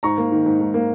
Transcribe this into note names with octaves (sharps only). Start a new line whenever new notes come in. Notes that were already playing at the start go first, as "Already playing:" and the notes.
G#2 A#5 C#6
A#3
D#3
G#2
G#2
A#3